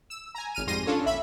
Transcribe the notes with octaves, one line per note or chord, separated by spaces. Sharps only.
E6
G#5 A#5
G#1 F6 D#7
F2 G#2 G3 C6 A#6 D#7
C#4 D4 F4 A4 C#5
A#1 E5 B5